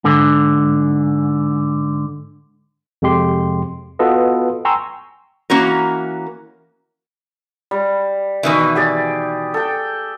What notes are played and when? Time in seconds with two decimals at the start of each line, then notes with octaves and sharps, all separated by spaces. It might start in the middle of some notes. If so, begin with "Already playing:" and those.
0.04 G#2 D3
3.02 F2 C3 G#3 G4 C6
3.99 B3 F4 F#4 A4 B4 D#5
4.65 G5 G#5 A#5 C6 C#6 E6
5.50 E3 A#3 C#4 F#4 A#4
7.71 G3
8.43 B2 D#3 E3
8.76 G4 G#4 D5
9.54 A4 G5